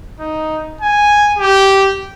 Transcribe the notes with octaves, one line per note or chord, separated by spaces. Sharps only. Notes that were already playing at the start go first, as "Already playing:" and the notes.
D#4
G#5
G4